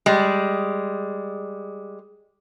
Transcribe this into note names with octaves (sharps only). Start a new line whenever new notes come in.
G3 G#3